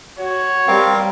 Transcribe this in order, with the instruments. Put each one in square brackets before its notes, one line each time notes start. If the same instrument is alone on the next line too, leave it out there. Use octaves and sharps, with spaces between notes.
[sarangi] F#4 [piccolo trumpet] C#5
[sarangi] G3 [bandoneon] C4 [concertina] A#4 F5